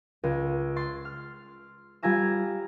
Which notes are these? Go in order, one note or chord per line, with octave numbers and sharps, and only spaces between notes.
C#2
C6 A6
F6
G3 F4 G#5 A#5 E6